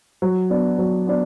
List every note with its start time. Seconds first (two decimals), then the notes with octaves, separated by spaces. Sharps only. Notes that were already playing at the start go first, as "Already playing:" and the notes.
0.22 F#3
0.50 B3 D4
0.78 F#3
1.07 B3 D4